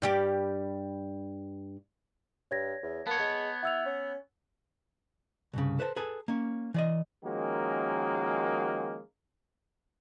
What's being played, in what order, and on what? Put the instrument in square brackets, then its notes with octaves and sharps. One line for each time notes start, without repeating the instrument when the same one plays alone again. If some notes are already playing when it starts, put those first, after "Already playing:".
[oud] G2 G3 G4
[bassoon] G2 [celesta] C#5 G#6 A#6
[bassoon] E2
[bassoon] A#3 [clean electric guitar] B3 C#5 [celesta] A5
[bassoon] G#3
[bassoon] E4 [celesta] F#5 E6 F7
[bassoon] C#4
[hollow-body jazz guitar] C2 G2 C#3
A4 B4 C5 F5 A5
G#4 A4 B4 G#5 A5
A#3 C#4
E3 D5 D#5
[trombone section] D#3 F3 G#3 A#3 C#4 F#4